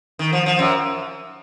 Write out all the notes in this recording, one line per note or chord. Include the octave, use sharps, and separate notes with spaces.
D#3
F3
F3
F#2